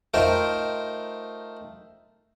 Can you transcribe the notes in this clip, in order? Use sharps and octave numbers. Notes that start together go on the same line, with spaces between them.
A3 D#4 F4 A#4 C5 G5